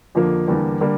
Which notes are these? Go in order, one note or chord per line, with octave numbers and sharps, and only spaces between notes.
F2 D3 F3 A#3
E2 D3 G3 A#3
D3 G3 A#3